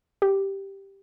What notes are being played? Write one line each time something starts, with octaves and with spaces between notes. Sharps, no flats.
G4